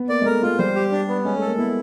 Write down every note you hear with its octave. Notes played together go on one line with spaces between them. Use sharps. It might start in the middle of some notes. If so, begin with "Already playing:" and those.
Already playing: B3
A#3 D5
G#3
A3 A#4
G#3 F4
G3 C5
G4
D4
B3
G#3 C#4
A3 A4
A#3
B3 E4